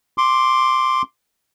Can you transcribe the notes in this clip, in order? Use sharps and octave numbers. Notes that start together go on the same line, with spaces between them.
C6 D6